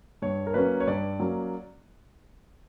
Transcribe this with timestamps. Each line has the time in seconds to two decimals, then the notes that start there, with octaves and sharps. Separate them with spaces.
0.22 G2 C#5
0.47 A#4
0.54 F#3 A#3 C#4 B4
0.80 C#5
0.87 G2 D5
1.20 F#3 A#3 C#4